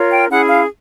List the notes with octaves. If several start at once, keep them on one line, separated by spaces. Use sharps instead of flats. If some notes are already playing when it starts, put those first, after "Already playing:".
Already playing: F4 A#4 C#5
G5
C#4 E4 G#4 F#5
F5